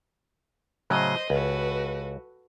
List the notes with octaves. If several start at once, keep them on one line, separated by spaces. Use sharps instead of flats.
A2 C#3 F#3 C5 D#5
C#2 F#4 A4 B4